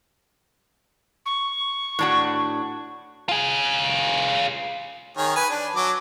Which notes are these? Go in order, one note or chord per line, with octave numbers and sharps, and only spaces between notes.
C#6
A2 D4 F#4
F4 G#4
D#3 G#4 C#5
B4 G#5
D4
F#3 D6